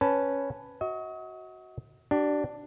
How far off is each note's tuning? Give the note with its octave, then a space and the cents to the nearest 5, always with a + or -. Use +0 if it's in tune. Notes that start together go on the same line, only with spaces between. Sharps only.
C#4 +0 B4 +0 A5 +0
F#4 +0 D#5 +40
D4 +5 G4 -40